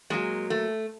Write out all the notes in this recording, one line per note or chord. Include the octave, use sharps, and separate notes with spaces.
A#2 F#3 G#3
A3